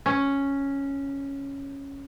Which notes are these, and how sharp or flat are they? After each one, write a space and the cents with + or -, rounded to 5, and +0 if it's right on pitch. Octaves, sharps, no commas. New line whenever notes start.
C#4 +0